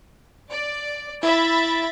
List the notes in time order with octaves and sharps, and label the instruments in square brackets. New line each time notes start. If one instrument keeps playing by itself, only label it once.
[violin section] D5
[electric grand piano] E4 [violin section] E5 B5 A6